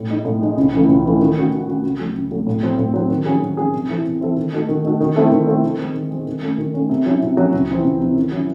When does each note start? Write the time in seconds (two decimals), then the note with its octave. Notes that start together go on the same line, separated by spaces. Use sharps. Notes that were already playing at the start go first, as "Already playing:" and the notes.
Already playing: A2
0.09 G#3 D#4
0.25 A2
0.41 G#3 D#4
0.57 C#2
0.73 C#3 E3 A3
0.89 C#2
1.04 C#3 E3 A3
1.21 D#3
1.36 A3 C#4 F#4
1.52 D#3
1.68 A3 C#4 F#4
1.83 C#3
1.99 F#3 A3
2.15 C#3
2.31 F#3 A3
2.47 A2
2.63 F#3 C4
2.78 A2
2.94 F#3 C4
3.10 D#3
3.25 F#3 C#4 G#4
3.41 D#3
3.57 F#3 C#4 G#4
3.74 C3
3.89 E3 C4 E4 A4
4.05 C3
4.21 E3 C4 E4 A4
4.37 D#3
4.52 A3 D#4 F#4 A4
4.69 D#3
4.85 A3 D#4 F#4 A4
5.00 D#3
5.16 A3 C4 E4 A4
5.32 D#3
5.47 A3 C4 E4 A4
5.63 D#3
5.79 G#3 C4
5.94 D#3
6.11 G#3 C4
6.26 D#3
6.43 A3 C#4
6.58 D#3
6.74 A3 C#4
6.89 C3
7.06 F#3 C#4 E4
7.22 C3
7.37 F#3 C#4 E4
7.53 C#2
7.69 C3 E3 C4
7.84 C#2
8.01 C3 E3 C4
8.16 D#3
8.32 F#3 C#4 E4